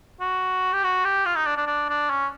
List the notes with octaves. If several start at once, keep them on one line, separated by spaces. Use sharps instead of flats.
F#4
G4
F#4
G4
F4
D#4
D4
D4
D4
D4
C#4